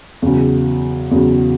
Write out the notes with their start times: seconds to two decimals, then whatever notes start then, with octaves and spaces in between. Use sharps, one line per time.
0.22 E2 C#3 F#3
1.11 E2 C#3 F#3